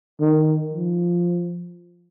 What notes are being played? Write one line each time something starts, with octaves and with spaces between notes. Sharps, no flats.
D#3
F3